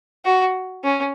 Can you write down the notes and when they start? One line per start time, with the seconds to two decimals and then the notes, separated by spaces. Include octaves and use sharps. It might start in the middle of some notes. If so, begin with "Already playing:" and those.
0.25 F#4
0.84 C#4